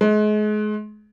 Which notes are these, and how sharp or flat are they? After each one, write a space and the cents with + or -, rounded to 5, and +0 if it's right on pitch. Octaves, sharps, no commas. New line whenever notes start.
G#3 +35